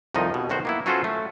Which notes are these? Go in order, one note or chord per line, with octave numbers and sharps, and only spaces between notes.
C2 F2 D#3 F3 D#4 D#5
B2
B1 D#3 F#4 C5
A#3 B3 E4
F#3 C#4 F4 F#4 A4 C5
A3